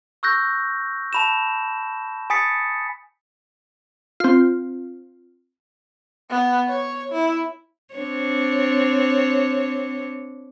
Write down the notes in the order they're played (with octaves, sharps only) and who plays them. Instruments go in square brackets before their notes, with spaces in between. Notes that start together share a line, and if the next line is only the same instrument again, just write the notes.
[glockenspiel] C#6 E6 F#6 G6 A#6
A5 B5 E7
G#5 B5 D#6 A6 B6 C#7
[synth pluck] C4 F4
[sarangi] B3
C#5
E4
[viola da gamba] C4 D4 C#5